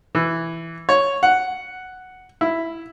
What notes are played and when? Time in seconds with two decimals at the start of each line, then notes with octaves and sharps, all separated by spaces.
0.15 E3
0.89 C#5
1.23 F#5
2.41 E4